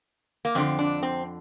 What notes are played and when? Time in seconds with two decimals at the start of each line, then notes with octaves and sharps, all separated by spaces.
0.45 A#3
0.55 F2 D3 C4
0.79 D4
1.03 C4